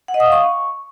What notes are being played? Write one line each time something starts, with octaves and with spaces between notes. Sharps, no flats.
F#5
D#5
D#6
F5
C#6